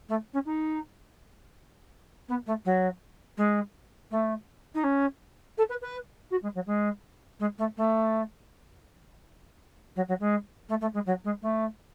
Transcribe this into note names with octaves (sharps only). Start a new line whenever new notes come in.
A3
C#4
D#4
B3
A3
F#3
G#3
A3
D#4
C#4
A4
B4
B4
F#4
G#3
F#3
G#3
G#3
A3
A3
F#3
F#3
G#3
A3
A3
G#3
F#3
G#3
A3